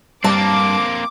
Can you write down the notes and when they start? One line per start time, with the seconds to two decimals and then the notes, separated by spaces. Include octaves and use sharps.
0.24 G2 A#3 C4 A5 D6